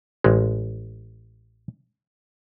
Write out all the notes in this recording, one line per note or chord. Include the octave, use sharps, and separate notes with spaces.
A1 G#3